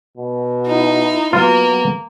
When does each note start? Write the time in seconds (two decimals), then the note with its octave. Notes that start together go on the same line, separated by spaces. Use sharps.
0.18 B2
0.66 D#4 E4
1.33 F#3 A#3 B3 F4